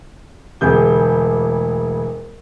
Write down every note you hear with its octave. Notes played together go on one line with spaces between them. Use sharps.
E1 D2 G4 G#4 G6